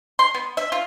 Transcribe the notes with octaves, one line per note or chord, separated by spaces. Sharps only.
C6
B3
E5
F4